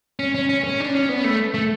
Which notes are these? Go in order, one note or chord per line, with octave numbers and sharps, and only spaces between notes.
C#4
C#4
C#4
C#4
D4
C#4
B3
A3
A3